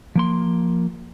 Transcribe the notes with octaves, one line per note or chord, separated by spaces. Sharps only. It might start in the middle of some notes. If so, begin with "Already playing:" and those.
F3 A#3 C6